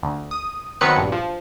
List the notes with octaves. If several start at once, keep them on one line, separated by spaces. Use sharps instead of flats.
D2
D#6
D#3 F#3 B3 C4 B4 C#7
A#1 G2
F3